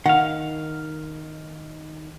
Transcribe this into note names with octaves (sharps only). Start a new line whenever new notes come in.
D#3 F5 F#5